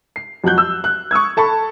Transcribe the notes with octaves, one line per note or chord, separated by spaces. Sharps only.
C7
F2 F#3 F#4 F#6 G6
E6
F#6
C#6 D#6 E6 G#6
A4 A5 B5 C#6